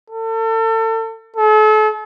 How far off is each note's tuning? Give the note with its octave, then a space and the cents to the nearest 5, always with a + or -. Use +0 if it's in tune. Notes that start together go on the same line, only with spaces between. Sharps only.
A4 +35
A4 -40